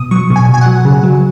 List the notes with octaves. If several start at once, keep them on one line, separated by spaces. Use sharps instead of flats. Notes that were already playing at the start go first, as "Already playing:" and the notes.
Already playing: B2 D#6
F#3 C#6
B2
G#5
B2 G#5
F#3 F#5
C#3
F#3